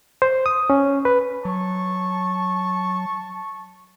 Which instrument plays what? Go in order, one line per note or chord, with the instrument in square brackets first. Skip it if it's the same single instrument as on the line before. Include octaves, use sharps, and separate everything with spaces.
[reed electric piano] C5
D#6
C#4
B4
[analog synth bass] F#3 [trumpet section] A5 C#6